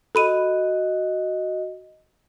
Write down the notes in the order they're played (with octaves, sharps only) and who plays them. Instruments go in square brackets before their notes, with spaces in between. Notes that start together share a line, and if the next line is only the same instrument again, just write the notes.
[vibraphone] F#4 D#5 [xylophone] A4 B5 D#7